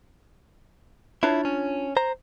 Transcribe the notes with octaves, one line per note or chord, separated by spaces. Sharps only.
D4 E4 F4 C#5
C#4
C5 A#5